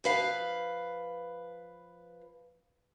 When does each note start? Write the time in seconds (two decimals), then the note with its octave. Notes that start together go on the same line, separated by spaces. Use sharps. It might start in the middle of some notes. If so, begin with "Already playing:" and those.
0.04 F3 B4 F5